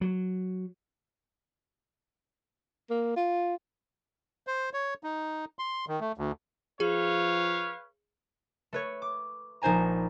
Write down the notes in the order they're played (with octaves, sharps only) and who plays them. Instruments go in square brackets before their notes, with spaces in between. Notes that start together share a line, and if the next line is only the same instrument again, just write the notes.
[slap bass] F#3
[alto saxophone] A#3
F4
[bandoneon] C5
C#5
D#4
C6
D#3
A3
D2
[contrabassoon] F3 [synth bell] G#4 [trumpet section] B4 C#5 F5
[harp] A3 B4 C#5
D6
A#1 D#4 C5 G#5 A#5